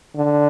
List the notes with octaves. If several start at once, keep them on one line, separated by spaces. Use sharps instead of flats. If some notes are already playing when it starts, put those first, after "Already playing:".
D3